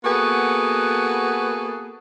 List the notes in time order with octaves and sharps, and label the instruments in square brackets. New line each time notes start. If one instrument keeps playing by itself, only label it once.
[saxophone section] A#3 B3 F#4 G#4 A4 B4